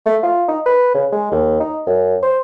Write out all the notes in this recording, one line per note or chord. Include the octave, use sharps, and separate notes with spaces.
A3
F4
D#4
B4
C#3
G#3
D#2
D#4
F#2
C5